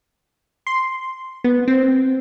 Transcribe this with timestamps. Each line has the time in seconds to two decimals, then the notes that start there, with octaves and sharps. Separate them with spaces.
0.67 C6
1.44 B3
1.68 C4